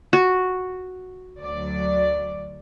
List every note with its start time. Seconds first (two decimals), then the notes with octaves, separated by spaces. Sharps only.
0.13 F#4
1.42 D2 F#3 D5